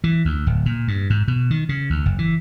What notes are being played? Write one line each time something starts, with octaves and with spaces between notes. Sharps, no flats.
E3
D2
D1
A#2
G2
G#2
B2
D#3
C#3
D2
F#1
E3